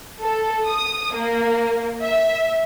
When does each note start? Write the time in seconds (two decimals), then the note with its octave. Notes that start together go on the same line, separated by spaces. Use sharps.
0.21 A4
0.68 D#6
1.15 A#3
2.04 E5